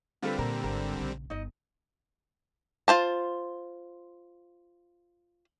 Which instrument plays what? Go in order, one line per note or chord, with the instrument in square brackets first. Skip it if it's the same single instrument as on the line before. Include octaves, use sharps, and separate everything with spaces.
[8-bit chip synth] D3 G3 C4 [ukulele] F4 A4 B4
[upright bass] A#2 [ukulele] A#4
[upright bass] G#1 [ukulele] A#4
[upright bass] A#1 C#3
[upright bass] G1 [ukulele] D#4 D#5
[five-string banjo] F4 C5 A5